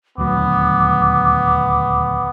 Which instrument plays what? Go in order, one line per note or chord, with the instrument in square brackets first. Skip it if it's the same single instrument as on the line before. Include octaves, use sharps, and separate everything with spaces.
[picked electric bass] D#1 D2 F#3 [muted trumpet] B3 [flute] D6